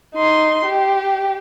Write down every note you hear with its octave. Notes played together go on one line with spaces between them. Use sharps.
D#4 C6
G4